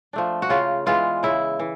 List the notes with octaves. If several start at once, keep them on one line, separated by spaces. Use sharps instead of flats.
F3 A3 D4
F#4
C#3 F4
E3 G#3 B3 F4
C#3 E4
E3